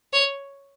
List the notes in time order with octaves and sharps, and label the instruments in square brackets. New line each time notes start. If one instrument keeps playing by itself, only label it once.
[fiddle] C#5